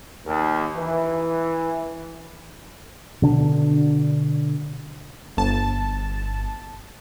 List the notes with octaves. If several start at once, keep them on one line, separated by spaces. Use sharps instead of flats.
D#2
E3
B2 D3 D4
G1 A5